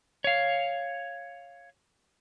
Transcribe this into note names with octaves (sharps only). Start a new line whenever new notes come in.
C#5 F5